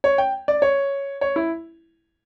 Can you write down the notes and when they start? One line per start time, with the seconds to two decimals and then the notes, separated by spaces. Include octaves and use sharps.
0.04 C#5
0.18 G5
0.48 D5
0.62 C#5
1.21 C#5
1.36 E4